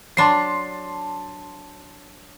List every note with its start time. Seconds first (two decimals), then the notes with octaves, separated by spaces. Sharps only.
0.17 F#3 D4 A5 C6 C7